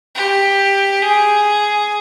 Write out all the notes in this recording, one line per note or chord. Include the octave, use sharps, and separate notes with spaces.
G4
G#4